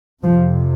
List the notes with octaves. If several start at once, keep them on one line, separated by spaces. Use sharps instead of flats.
F2 C3 F3